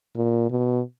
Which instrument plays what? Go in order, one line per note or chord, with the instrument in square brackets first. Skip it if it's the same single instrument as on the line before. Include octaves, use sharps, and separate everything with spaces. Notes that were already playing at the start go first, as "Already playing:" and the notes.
[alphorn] A#2
B2